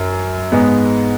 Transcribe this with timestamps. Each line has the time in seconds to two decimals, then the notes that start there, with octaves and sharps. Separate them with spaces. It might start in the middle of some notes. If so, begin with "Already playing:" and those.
Already playing: F#2
0.52 G#2 G#3 B3